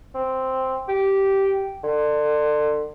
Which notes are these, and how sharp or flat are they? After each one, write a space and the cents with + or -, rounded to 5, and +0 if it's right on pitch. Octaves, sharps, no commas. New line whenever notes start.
C4 +0
G4 -10
D3 +30